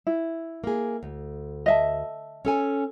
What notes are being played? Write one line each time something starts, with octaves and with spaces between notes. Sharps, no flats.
E4
A#3 G#4
D2
D#5 E5 A5
C#4 A4 G#5